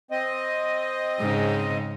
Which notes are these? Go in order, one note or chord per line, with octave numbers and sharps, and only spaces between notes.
C4 D#5
G#2 C#3